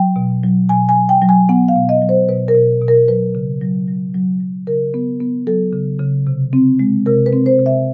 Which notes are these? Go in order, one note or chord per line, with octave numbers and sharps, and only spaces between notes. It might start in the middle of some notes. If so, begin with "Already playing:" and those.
Already playing: F#3 G5
B2
F#3
B2 G#5
G#5
F#3
G5
F#3
G#5
B3 F#5
F5
B2
D#5
F#3
C5
B2 B4
A#4
B2
B2
A#4
F#3 B4
C#3
F#3
F#3
F#3
F#3
C#3 A#4
B3
B3
F#3 A4
C#3
C#3
C3
C4
G#3
C3 A#4
B4
C4
C5
C3
E5